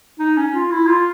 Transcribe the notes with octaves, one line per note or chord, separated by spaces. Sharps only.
D#4
C#4
F4
E4
F4